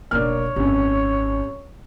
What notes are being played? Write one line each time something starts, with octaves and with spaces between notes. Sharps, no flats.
F1 B1 A#3 D4 C#5 F6
G#1 F#2 C3